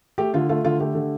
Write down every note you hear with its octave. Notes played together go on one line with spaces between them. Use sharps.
A3 G4
D3 F4
A3 F4
D3 F4
A3 G4
D3